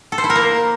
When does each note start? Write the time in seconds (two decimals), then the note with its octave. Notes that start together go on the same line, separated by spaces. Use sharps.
0.12 A4
0.18 C5
0.24 E4
0.30 A#4
0.36 A#3